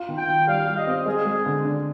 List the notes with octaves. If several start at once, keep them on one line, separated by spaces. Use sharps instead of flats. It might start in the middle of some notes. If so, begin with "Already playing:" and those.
Already playing: F4
D#3
G5
D#3
G3 F5
G3
D#5
C4
G#3 G#4
G#3
D3
D4